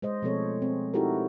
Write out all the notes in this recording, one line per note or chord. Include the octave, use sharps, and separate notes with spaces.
G#3 C5 D#5
B2 F3 A3 C4 A4 C#5
C4
D#4 E4 F#4 G4 A4 A#4